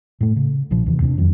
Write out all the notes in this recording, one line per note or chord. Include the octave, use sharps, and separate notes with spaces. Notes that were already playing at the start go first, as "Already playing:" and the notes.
A2 A3
C#3
A#1 A#2 F3
D#2 C3 E3
D#2 C3 A#3 D4
F2 D#3 F#3